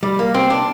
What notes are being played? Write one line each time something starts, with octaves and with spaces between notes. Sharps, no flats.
G3
A#3
C4
D4